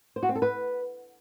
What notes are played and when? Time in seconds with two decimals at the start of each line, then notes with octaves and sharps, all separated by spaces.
0.16 C5
0.23 F#4
0.29 C4
0.35 A4
0.42 B4